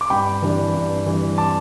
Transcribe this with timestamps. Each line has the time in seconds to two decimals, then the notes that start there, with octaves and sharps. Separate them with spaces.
0.01 D6
0.10 G2 G5 B5
0.42 E3 G3 D4
0.74 G2
1.06 E3 G3 D4
1.38 A5 D6